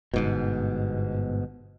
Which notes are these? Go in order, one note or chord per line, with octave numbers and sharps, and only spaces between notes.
G1 G#2 B2